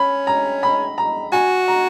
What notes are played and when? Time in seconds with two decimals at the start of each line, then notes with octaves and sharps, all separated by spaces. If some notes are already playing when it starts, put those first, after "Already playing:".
Already playing: C#4 B5
0.27 A#5
0.63 B5
0.98 A#5
1.32 F#4 G#5
1.68 A#5